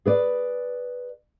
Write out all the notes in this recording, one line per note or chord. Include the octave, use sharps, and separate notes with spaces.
G#4 B4 D5